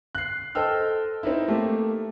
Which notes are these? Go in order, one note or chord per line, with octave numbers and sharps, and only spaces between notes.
F#6 C7
A4 C5 D#5 G5 E6 F6
C4 D#4 E4
A3 A#3 G4